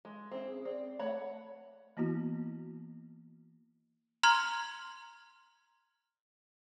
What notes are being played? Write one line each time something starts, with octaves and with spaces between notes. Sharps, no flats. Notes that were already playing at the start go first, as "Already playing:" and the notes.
G#3
C4 C#4 E4
G#4
C4 D5
A3 C#5 F#5 B5
E3 A#3 B3 E4 F#4
A#5 C6 F6 G#6 F#7